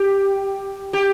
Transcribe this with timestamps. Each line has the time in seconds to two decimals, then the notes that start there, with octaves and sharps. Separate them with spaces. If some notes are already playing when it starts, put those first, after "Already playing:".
Already playing: G4
0.93 G4